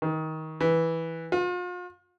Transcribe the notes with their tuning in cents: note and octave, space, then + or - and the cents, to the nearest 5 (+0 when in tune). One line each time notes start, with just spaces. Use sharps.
D#3 +20
E3 -10
F4 +40